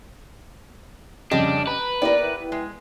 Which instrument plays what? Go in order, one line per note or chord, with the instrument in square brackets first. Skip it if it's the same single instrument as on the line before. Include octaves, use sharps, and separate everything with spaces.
[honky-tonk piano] F2 C#3 G3 [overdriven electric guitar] D4 [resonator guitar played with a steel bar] G4 D#5
[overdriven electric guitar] B4 [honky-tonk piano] A#5
[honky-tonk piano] B3 E4 G4 [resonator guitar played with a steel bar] A#4 D5
[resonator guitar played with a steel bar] G#3